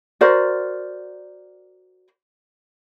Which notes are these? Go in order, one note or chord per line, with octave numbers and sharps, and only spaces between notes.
F#4 A#4 C5 D5